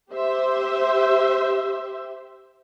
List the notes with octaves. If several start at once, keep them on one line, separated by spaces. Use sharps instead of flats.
G4 C5 E5